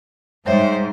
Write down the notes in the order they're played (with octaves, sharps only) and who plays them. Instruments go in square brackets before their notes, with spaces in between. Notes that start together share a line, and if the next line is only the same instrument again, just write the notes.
[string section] G#2 [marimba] G3 C#5 E5 [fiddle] C5